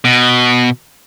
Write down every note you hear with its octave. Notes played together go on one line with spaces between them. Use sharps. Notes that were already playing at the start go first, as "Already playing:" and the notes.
B2